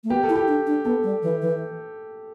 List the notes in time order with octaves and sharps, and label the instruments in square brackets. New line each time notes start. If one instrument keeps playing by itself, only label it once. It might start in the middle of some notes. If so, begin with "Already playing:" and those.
[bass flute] A3
[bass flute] B3 [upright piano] G4
[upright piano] A4
[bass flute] E4
[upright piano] G4
[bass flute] D4
D4
[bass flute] B3 [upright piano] A4
[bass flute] G3
E3
E3